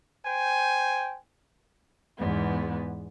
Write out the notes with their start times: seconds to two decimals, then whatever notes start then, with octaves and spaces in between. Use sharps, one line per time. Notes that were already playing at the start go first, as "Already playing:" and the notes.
0.24 C5 G5 G#5
2.18 E2 G#2 B3